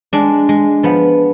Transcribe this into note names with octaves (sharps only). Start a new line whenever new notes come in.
G#3 D4
G#3
F3 B3